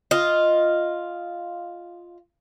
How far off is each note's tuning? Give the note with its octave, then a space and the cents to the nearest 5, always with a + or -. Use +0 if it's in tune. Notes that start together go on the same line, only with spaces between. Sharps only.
F4 +0 D#5 +0